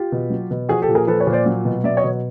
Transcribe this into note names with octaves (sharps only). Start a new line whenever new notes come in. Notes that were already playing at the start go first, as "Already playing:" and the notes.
Already playing: F4 G4
B2
F#3
B2
F3 F#4 G#4
G4 A4
A#2
G#4 A#4
F3 A4 B4
B4 C#5
A#2
C5 D5
F#3
B2
F#3 D5 E5
C#5 D#5
B2